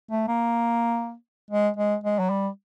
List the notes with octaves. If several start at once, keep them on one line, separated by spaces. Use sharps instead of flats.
A3
A#3
G#3
G#3
G#3
F#3
G3